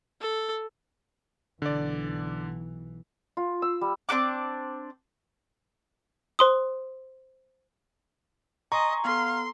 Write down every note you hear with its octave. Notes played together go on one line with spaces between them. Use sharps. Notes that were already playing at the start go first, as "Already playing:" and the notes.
A4
B1 D3 E3 D5
F4
E6
G3
C4 D4 F#4 D6
C5 C6 D#6
D#5 G#5 A#5 C6 C#6
B3 A4 F5 C6